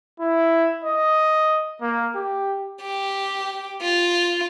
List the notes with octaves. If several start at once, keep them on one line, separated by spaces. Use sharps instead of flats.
E4
D#5
A#3
G4
G4
F4